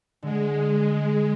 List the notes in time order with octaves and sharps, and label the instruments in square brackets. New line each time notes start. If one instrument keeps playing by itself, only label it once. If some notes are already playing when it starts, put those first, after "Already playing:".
[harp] D3 [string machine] G#3